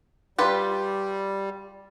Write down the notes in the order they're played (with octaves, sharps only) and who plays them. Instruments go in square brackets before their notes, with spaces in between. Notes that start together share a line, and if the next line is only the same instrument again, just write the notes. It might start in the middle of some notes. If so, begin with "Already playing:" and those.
[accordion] G3 [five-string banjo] F4 G4 B4